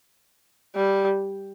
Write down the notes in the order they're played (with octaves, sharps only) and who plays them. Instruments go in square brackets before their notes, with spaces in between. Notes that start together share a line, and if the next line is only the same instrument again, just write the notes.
[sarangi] G3